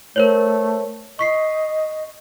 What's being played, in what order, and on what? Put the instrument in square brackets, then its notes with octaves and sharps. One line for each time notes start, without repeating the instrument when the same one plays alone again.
[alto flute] A3 [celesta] A#4 C5 C#5
[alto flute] D#5 [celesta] C#6 B6 C7